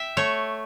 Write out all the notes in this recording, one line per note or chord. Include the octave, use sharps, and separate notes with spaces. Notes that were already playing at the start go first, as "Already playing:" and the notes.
Already playing: E5 G5
A3 C#5